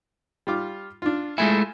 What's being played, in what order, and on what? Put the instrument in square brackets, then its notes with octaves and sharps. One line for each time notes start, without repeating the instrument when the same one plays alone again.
[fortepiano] G3 F4 D6
D4 F4
[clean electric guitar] G#3 A3 E4 [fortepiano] F4 G#5